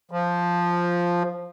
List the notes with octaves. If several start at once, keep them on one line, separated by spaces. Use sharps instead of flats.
F3